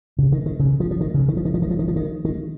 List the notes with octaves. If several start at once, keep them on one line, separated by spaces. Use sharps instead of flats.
C#3
D#3
D#3
C#3
F3
F3
D#3
C#3
D#3
F3
D#3
F3
D#3
F3
D#3
F3
D#3
D#3